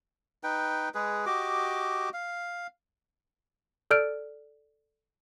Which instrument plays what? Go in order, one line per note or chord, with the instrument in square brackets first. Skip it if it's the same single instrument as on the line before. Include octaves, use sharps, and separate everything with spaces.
[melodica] D#4 B4 G5
G#3 G#4 B4
F#4 G4 D#5 D6
F5
[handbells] A4 D5 F6 G6 D7